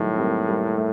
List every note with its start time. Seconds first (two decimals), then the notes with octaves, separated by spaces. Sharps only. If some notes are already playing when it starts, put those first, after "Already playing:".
Already playing: A2 D#3 F#3 G3
0.14 C4
0.18 G3 A#3
0.48 G3 A#3
0.78 A3